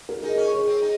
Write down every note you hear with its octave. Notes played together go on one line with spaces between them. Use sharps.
A#4
D#4 G#4
C#4
G#4
C4
D#4